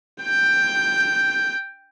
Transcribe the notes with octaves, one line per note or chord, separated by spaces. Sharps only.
G5 G6